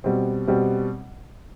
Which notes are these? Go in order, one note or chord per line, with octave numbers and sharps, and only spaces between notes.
B2 G3 C4
B2 G3 C4